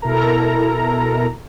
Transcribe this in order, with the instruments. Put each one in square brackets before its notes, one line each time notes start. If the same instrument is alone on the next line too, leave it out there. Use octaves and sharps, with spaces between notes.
[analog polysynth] B2 E4 A4 A#4 A#5